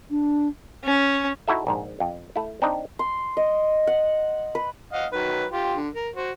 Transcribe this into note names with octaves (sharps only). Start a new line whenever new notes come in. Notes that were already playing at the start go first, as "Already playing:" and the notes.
D4
C#4
D#4 E4 F#4 A4 E5
A#1 G#2
F2
A3 E4
C4 D4 D#4
C6
D#5
F#5
B4
D#5 F5 F#5
D#3 F#3 B4
F4 G4
D3
A#4
F#4 C5